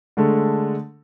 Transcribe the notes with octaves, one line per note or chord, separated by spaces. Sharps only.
D3 G#3 A3 A4